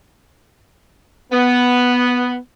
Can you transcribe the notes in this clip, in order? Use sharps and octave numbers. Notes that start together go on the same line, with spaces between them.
B3